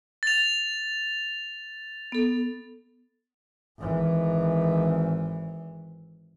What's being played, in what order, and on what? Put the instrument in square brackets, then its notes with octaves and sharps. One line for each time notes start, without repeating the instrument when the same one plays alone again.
[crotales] A6 F7
[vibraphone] B3 A4
[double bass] G#1 E3